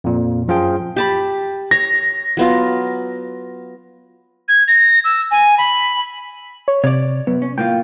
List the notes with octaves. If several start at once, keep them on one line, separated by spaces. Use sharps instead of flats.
F2 A#2
F#2 F3 F4 G#4 G5
G4 A5 B5
C#5 A#6
F#3 B3 F4
G#6
A#6
E6
G#5
B5
C#5
C3 C#5 D5
F#2 B3
C#4
A2 A#3 F4 G5